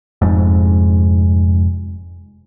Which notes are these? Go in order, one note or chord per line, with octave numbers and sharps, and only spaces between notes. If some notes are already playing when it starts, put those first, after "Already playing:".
F1 F2 G#2